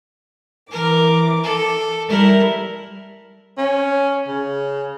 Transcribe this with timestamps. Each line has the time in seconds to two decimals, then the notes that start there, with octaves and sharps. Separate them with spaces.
0.71 E3 A#4 D6
1.44 A4
2.09 G3 E4 A#4
3.58 C#4
4.28 C#3